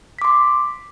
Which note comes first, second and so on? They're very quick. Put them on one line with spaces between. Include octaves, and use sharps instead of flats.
B6 D6 C6